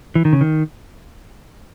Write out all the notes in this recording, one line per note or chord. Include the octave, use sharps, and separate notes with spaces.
E3
D#3
C#3
D#3